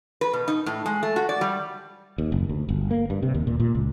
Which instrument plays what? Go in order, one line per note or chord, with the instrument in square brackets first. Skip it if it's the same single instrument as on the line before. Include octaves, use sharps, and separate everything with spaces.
[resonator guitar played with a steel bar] B4
B2
D#4
A2
G#3
A3
F#4
D5
G3
[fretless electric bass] D#2
F#1
D2
G1
A#3
G2
C3
D#2
A#2
A#2
C#2